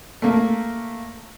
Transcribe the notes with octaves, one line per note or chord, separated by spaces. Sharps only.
A3 A#3